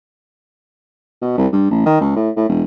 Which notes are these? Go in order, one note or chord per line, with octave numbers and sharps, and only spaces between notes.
B2
C2
G2
A1
D#3
C#2
A2
A2
E1